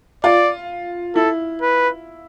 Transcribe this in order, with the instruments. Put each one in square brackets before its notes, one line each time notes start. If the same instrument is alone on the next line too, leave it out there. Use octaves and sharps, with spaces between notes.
[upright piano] F4 [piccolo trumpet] D5
[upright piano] E4 [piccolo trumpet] A4
[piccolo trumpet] B4